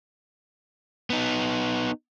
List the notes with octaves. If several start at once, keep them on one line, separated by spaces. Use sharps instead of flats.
B3 D#4